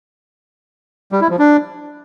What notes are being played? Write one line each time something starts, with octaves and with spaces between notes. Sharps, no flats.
G3
E4
F3
D4